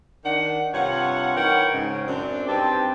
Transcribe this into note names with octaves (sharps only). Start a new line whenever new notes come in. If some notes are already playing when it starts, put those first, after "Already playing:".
D#3 D4 F#5
G2 C3 F4 C#5 F#5
E3 D#4 A#4 C#5 F#5 G5
G#2 C#3
F#2 A2 C4 D4
G2 C4 D#4 G4 B4 A5